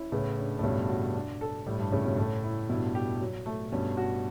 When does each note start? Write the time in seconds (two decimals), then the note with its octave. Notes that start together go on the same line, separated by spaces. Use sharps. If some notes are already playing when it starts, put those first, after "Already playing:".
Already playing: C#4 E4
0.12 A2 C#3 B3
0.38 D4
0.59 A2
0.63 G2 B2 C#4
0.89 F#4
1.14 D4
1.41 A4
1.66 A2 G3
1.79 G2
1.92 A2 C#3 C#4
2.05 G2 B2
2.17 A2 A3
2.43 E4
2.69 G2 B2 E4
2.95 G4
3.21 F#3
3.46 A3
3.72 G2 B2 C#4
3.97 F#4